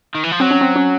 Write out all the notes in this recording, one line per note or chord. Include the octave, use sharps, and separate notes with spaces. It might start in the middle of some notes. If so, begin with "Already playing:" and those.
D#3
E3
F3
F#3 C4
C#4
C4
C#4